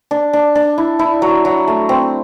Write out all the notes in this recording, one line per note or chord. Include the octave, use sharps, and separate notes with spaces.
D4
D4
D4
E4
E4
F#3
F#3
A3
C4